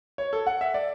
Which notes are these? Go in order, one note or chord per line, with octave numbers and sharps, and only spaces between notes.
C#5
A4
F#5
E5
D5